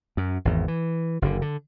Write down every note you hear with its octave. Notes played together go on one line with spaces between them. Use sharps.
F#2
G#1 E2
E3
F#1 A#2 D3
D3